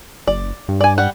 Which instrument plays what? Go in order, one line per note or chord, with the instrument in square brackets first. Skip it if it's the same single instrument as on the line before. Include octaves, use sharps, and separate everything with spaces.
[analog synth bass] F#1 [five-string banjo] D5
[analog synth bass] G2
[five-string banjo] D5 G#5
G3 F#5